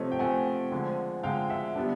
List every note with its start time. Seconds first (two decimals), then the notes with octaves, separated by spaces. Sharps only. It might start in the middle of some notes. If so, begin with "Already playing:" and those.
Already playing: C3 F3 A3 C#5 D#5
0.12 G5
0.19 C3 F3 A3 F#5 G#5
0.72 D3 F3 G#3
1.23 D3 F3 G#3 F5 G5
1.50 E5 F#5
1.76 G3 B3 D4